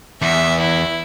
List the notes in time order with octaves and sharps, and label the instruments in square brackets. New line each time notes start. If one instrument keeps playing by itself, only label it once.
[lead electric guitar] E2 [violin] E5
[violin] E4